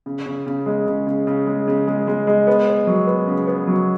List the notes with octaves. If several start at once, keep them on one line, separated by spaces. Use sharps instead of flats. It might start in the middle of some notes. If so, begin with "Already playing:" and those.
C#3
C#3
C#3
G#3
C#3
C#3
C#3
G#3
C#3
G#3
G#3
G#3
B3
B3
F#3
B3
C#3
B3
F#3